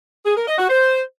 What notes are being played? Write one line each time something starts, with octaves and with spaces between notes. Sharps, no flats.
G#4
A#4
D#5
F#4
C5